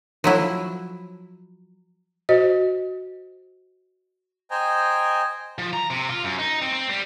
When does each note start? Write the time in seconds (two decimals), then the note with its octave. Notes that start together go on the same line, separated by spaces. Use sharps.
0.24 F3 F#3 E4
2.29 F#4 C5 D#5
4.50 C5 D#5 G5 G#5 A#5
5.58 F3
5.73 A#5
5.90 C3
6.09 F4
6.24 F#2
6.39 D#4
6.62 C4
6.73 C4
6.89 G3